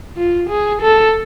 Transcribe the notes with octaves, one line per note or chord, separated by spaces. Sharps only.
F4
G#4
A4